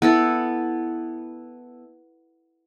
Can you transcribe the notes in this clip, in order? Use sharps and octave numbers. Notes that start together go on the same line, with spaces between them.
B3 E4 A4